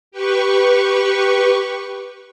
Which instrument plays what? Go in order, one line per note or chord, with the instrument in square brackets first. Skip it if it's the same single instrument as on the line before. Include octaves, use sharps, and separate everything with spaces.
[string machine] G4 B4 C#6